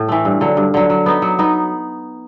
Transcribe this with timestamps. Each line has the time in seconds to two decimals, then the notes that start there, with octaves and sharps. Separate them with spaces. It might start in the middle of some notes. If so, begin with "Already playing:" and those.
Already playing: A2
0.09 E3 A3
0.25 G2
0.41 D3 F#3
0.57 G2
0.74 D3 F#3
0.90 F#3
1.06 B3 D#4
1.22 F#3
1.39 B3 D#4